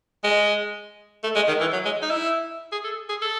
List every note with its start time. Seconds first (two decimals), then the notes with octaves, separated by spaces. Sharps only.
0.24 G#3
1.23 A3
1.35 G#3
1.48 D#3
1.61 E3
1.72 F#3
1.85 G#3
2.02 D#4
2.10 E4
2.72 G#4
2.84 A4
3.09 G#4
3.22 A4